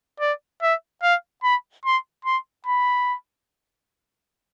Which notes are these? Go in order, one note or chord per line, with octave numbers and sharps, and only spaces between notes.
D5
E5
F5
B5
C6
C6
B5